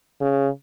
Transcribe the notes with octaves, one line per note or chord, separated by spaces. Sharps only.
C#3